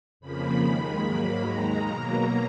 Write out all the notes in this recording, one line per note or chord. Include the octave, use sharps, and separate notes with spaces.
F2 C#3 F3 A#3 B5
D#2 D#3 G#3
G#2 F#3 A#3
D#2 D#3 G#3 A#5
B2 F#3 A#3